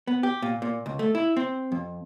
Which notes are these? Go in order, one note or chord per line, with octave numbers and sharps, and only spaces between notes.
B3
G4
A#2
A#2
C#2
A3
E4
C4
F2